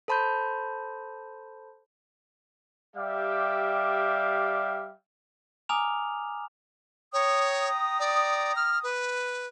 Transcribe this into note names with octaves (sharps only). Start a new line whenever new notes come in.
A4 C5 A5 B5 C6 G6
G3 G4 D5 E5 F5 G5
G#5 A#5 D6 D#6 F6 F7
C#5 G5 A#5 D#6
D5
F6
B4